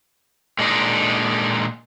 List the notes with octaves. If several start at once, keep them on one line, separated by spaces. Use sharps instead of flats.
A#2 G#3 D4 D#4